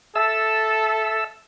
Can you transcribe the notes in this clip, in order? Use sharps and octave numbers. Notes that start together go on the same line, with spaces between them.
A4 E5 A5 E6